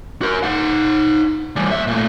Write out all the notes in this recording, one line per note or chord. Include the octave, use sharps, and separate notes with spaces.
F#4 A#4
D#4 F#5
E3 G3
D#2 E5
A#2 A3